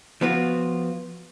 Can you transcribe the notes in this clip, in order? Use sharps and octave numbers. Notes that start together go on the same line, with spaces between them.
F3 B3 F4 F#4